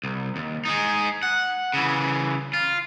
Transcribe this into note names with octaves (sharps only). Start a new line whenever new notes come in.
C2
D#2
G#3 D#4
F#5
C#3 E3
F4